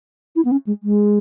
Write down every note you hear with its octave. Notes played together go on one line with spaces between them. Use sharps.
E4
B3
C#4
G#3
G#3